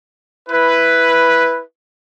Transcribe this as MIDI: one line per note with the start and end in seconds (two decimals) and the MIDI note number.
0.49 1.61 64
0.49 1.61 71